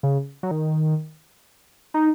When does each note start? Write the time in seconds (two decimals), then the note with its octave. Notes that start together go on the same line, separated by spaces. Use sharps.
0.03 C#3
0.43 F#3
0.51 D#3
1.94 D#4